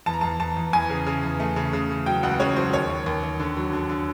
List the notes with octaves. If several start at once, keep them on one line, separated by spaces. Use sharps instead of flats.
E2 A5
A#5
E2 A5
E2 A5
E2
E2 G#5
C#3
C#3
E2
A3
C#3
C#3
C#3
F#3 G5
C#2 F#5
C#3 C#5
F#3 C5
D#2 C#5
D#2
D#2
D#2
D3
F#3
D3
D3